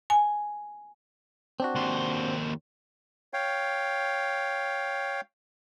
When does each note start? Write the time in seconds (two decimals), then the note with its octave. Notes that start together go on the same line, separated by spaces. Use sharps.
0.10 G#5
1.60 C4 D4 F#4
1.76 D#2 C5
3.34 C#5 F5 G5